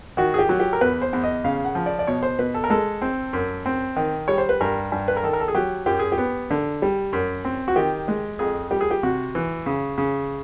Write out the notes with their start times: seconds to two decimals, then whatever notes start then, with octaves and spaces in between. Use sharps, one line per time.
0.17 D#3 F#4
0.34 G#4
0.39 G4
0.49 F#3
0.60 G4
0.73 A#4
0.81 E2 B4
1.02 C5
1.13 E2
1.24 D#5
1.44 C#3 F5
1.65 F#5
1.75 F3
1.86 D5
1.99 D5
2.07 B2 C#5
2.23 C5
2.39 B2 B4
2.54 A4
2.64 A#4
2.70 G#3 A4
3.02 C4
3.33 F#2
3.66 C4
3.96 D#3
4.28 G3 C#5
4.38 C5
4.49 B4
4.61 G2 A#4
4.92 G2
5.08 B4
5.17 A#4
5.23 D#3 A4
5.33 A#4
5.40 A4
5.48 G#4
5.55 F#3 G4
5.86 F#2 G4
5.99 G#4
6.12 G4
6.18 B3
6.51 D3
6.82 G3
7.13 F#2
7.45 C4
7.68 F#4
7.76 D#3 G4
8.08 G#3
8.39 F2 G#4
8.71 G3 G4
8.81 G#4
8.91 G4
9.03 C3 F#4
9.35 E3
9.66 C#3
9.98 C#3